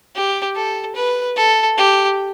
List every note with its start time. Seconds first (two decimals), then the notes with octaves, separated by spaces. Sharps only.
0.15 G4
0.56 A4
0.96 B4
1.37 A4
1.78 G4